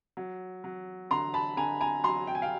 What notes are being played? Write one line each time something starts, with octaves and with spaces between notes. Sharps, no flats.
F#3
F#3
D3 A#5 C6
A5 B5
D3 G#5 A#5
G#5 A#5
F#3 A#5 C6
G5
G#5
F5 G5